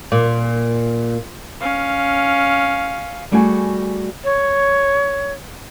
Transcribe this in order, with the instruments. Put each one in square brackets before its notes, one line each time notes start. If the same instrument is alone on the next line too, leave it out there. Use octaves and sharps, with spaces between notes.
[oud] A#2
[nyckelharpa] C#4 F5
[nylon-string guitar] G3 A3 F#4 G#4 G#5
[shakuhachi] C#5